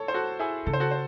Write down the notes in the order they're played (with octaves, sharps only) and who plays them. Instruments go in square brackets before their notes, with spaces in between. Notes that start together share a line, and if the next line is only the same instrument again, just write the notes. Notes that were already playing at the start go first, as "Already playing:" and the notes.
Already playing: [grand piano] A4 C#5
C5
F#4 A4
E4 G#4
[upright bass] C#3 [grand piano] A4
[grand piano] C5
F#4 A4
C5